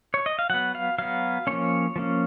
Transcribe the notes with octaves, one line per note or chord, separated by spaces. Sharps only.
C#5
D#5
F5
F#3 B3 F#5
F5
F#3 B3 F5
F3 A#3 C#4 C#5
F3 A#3 C#4